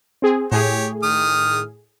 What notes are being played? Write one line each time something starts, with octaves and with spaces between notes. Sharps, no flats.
C4 G#4
A2 G4 G#4 C#5
D#3 D#6 F6